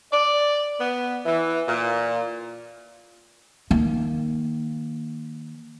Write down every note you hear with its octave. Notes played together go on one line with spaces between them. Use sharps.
D5
B3
E3
A#2
D#3 A#3